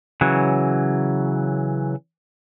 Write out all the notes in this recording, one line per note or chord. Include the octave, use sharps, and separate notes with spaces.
C#3 E3 F#3